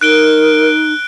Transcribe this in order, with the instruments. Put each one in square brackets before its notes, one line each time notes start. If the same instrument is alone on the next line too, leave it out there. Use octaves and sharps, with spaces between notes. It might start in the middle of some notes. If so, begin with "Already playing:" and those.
[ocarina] D#4 [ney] A#4 [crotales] F#6 D7 G7